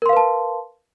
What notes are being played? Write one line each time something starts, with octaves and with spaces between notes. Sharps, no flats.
A#4 B4 F5 A5 C6